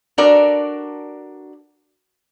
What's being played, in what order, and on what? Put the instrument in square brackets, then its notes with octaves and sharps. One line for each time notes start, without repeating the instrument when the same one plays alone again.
[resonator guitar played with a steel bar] D4 F#4 A4 A#4 D5